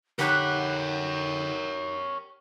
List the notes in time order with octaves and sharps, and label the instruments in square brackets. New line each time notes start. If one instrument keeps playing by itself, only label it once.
[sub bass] D3 [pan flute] D#4 [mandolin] G4 F#5 B5 [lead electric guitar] A#4 C#5